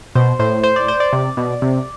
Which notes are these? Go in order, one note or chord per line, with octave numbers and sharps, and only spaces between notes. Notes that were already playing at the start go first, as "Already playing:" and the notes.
B2 C5
A2 C5
C5
D5
C5
D5
C3
B2
C3